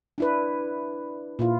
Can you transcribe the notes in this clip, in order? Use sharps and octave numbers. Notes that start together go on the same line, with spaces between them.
D4 E4 B4
A#2 E4 F4